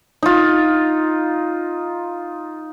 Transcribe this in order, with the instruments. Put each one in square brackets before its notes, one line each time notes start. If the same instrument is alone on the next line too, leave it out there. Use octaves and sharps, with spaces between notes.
[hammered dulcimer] D#4 F4